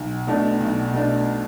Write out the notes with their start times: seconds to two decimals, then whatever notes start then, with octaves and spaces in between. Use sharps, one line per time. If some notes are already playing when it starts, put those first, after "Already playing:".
Already playing: B1
0.27 B2 A3 D4
0.60 B1
0.93 B2 A3 D4